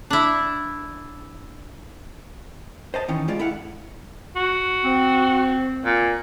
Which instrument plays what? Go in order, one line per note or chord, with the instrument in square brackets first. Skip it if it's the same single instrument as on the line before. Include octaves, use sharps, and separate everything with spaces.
[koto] D4 E4
[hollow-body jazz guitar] C5 D#5 A5
D#3 E3 C#4 D#4
G3 G#3 F4 D5
E4 A4 F5 F#5
[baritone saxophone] F#4
[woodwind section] C4
[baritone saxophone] A#2